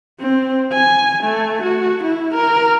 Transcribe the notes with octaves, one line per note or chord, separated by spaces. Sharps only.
C4
G#5
A3
F#4
E4
A#4